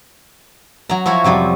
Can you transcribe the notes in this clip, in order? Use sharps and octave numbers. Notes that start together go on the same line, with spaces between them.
F#3 A#5
F3 E4 F#4 C#5
F2 C3 F#3 G3